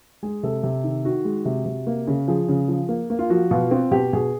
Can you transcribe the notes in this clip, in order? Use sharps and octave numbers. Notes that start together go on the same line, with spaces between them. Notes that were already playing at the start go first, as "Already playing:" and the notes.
G#3 G#4
C3 A4
C3
D#3
D#3 F#4
G#3
C3
C3
A#3
C#3
F3 G#4
C#3
F3
A#3
A#3
F4
F3 F#4
B2 F4
C4 F4
B2 G4
B2 G#4